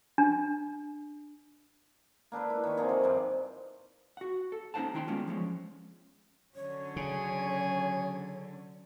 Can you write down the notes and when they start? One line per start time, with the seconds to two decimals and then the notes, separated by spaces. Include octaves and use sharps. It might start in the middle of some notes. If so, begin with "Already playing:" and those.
0.18 D4
2.32 A#3 D4 A4 B4
2.50 E4
2.64 D#3 C#5
2.77 C3 A#3 G#4 D#5
2.89 F3
3.03 G2 G3
4.17 F#4 F#5
4.52 A4
4.74 A#3 C#4 D#4 C5 F#5 A5
4.94 D#3 E4 G5 C6
5.08 G3 G#3 A#3 B3 C#4 F4
5.27 F3 G#3 C#4
6.55 D3 F#3 C#4 C#5
6.96 C#3 G#4